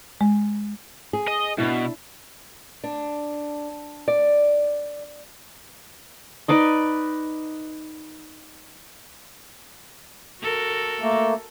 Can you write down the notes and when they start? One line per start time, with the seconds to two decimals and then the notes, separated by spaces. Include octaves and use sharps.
0.21 G#3
1.13 G#4
1.28 D#5
1.58 B2 D4 E4
2.84 D4
4.08 D5
6.48 D#4 B4 D5 D#5
10.42 F#4 A4 A#4
11.01 A3 A#3